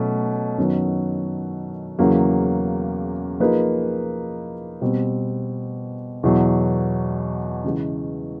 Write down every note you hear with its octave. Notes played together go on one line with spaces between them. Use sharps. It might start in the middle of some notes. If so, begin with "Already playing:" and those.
Already playing: B2 F#3 A3 C#4
F#2 D#3 F#3 B3
E2 C#3 F#3 A#3
F3 A#3 D#4 G#4 B4
B2 G3 C4
E2 B2 F#3
C#3 E3 G#3